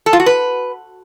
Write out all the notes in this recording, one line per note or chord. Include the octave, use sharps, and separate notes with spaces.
A4
F4
F#4
B4